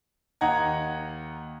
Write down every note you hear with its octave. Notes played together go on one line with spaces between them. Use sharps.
D#2 D#4 F#5 A#5 G#6